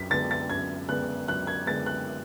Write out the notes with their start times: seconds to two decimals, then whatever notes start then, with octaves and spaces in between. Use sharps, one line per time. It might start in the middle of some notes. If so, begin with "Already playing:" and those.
Already playing: F#2 B6
0.10 D3 G#3 B3 A6
0.31 A6
0.50 F#2 G#6
0.88 D3 G#3 B3 F#6
1.28 F#2 F#6
1.47 G#6
1.66 D3 G#3 B3 A6
1.86 F#6